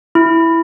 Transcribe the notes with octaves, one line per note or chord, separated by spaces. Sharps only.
E4